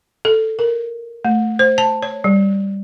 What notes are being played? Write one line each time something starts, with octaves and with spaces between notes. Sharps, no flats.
A4
A#4
A3
C5
A5
C#5
G3